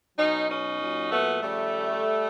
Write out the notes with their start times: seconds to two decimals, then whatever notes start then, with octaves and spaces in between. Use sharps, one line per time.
0.18 B2 F#3 C#4 D#4
0.49 C#4 D#4
0.80 A#2 F#3
1.10 A3 B3
1.41 C#3 F3 G3 A3